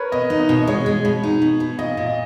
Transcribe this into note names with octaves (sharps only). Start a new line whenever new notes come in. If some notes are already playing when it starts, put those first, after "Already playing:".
Already playing: A#4 B4 C#5
B2 D#5
D#4
D#5
B2
D#5
G#3 C#5
G#3
B2
D#4
B2
B2
A#2 D#5
A#2
D#5